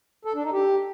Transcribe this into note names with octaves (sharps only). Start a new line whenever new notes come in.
A4
D4
D#4
G4